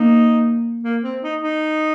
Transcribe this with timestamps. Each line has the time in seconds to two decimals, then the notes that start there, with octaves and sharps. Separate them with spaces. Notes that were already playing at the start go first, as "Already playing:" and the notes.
Already playing: A#3 D#4
0.83 A#3
1.03 C4
1.22 D#4
1.41 D#4